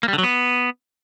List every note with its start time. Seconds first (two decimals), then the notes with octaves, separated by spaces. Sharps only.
0.03 A#3
0.08 G3
0.13 D3
0.18 F#3
0.23 B3